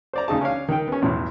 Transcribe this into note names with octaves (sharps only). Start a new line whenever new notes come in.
C5 D5 A#5
D2 C#3 D#4 G#4 A5
C#4 D4 C#5 F5
D#3 G5
B3 C#4
B1 E2 A2